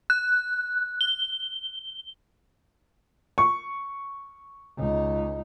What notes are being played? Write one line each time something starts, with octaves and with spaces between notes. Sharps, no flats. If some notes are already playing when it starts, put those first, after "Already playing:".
F#6
G7
C#6
C#2 D#4